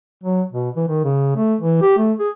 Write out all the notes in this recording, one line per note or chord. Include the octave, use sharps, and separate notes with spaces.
F#3
B2
E3
D#3
C#3
A3
E3
G4
A3
G#4